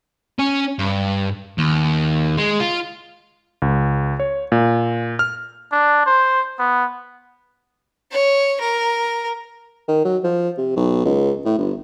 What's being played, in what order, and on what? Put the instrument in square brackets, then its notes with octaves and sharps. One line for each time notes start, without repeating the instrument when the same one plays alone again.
[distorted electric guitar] C#4
G2
D#2
G#3
F4
[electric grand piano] C#2
C#5
A#2
F6
[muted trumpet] D4
C5
B3
[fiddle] C#5
A#4
[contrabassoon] D#3
F#3
F3
C3
B1
C#2
A2
G1